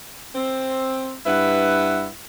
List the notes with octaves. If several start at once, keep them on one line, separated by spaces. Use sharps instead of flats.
C4
G2 E4 B4 F#5